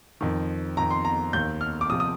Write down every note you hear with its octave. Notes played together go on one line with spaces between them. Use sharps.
F2 D#3
F2 D#3 A#5
C6
A#5
D#2 D#3 G6
F6
D6
C3 F3 D#6
D#6